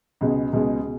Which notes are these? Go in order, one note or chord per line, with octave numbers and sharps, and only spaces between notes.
C#2 B2 G#3
C#2 B2 G#3